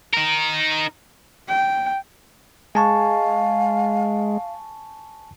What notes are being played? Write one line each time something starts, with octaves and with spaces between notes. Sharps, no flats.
D#4 A#4
G5
G#3 F5 G#5 A5 C#6